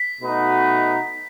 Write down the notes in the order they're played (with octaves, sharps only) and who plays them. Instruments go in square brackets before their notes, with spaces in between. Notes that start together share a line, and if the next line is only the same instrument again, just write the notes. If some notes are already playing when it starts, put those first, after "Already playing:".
Already playing: [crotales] B6
[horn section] B2 A3 D#4 F#4 B4